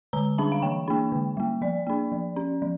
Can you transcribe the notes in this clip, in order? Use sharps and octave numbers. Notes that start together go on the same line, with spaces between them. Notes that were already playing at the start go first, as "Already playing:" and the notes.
D3 A#5
G3 D4 A5
F5
E3 G5
A#3 D4
D3
G3 A#3
F3 D5
A#3 D4
F3
C#4
F3